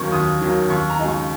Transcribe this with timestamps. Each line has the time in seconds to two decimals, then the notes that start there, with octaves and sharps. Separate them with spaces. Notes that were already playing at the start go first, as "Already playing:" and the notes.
Already playing: D#2 D#3 F#3 A#3 C#4 C#6
0.12 D#2 D#6
0.41 D#3 F#3 A#3 C#4
0.69 D#2 C#6
0.90 A#5
0.99 C#3 G#3 D#4
1.08 C#6